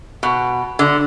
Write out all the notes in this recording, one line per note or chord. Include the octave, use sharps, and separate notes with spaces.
B2
D3